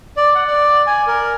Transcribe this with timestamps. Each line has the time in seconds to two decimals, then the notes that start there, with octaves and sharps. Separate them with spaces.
0.17 D5
0.35 F#5
0.48 D5
0.87 G#5
1.07 A#4